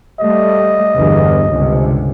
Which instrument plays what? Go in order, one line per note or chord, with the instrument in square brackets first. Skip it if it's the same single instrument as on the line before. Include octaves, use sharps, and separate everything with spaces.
[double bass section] G3 A3 [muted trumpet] D#5
[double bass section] G1 E2
G1 C#2 C3